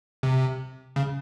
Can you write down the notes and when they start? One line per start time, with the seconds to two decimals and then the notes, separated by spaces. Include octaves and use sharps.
0.23 C3
0.96 C#3